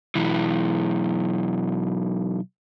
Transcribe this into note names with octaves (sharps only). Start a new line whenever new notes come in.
B1 E3